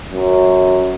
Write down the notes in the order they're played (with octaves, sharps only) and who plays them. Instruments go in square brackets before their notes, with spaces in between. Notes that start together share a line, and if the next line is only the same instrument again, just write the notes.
[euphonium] F#2